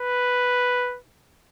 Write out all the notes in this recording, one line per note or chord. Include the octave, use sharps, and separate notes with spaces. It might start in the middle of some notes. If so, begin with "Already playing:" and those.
Already playing: B4